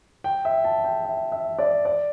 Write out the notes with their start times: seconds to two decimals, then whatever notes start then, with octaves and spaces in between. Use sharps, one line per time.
0.24 G5
0.45 E5
0.64 A5
0.85 G5
1.05 E5
1.32 E5
1.59 D5
1.85 D5